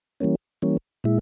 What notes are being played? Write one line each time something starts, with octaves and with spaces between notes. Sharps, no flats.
E3 G3 A#3 C#4
E3 G3 A#3 C#4
A#2 G#3 E4